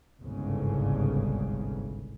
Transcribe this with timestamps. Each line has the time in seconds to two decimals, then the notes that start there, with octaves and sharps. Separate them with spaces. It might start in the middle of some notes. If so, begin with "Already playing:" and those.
0.22 G1 C2 G#2 C#3